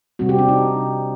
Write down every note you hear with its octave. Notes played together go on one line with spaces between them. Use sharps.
C3 G3 C4 F#4
G4
D4
D#4